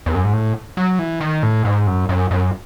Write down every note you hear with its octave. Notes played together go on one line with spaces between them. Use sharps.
E2
F#2
G#2
A2
F#3
E3
D#3
A2
G#2
F#2
F#2
F#2